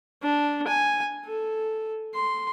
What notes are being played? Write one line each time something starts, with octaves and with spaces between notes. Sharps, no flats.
D4
G#5
A4
C6